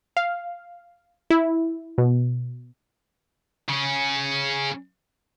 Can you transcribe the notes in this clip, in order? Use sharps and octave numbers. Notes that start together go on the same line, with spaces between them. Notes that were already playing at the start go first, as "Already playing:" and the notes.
F5
E4
B2
C#3 C#4